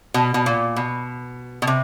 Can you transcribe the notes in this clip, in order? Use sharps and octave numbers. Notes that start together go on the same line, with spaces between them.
B2
B2
A#2
B2
B2
C3